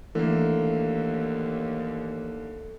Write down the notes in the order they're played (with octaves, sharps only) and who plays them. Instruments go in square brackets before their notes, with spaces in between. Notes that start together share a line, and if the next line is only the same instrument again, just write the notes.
[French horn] D#2 [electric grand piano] D3 A#3 [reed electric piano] E3 [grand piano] A3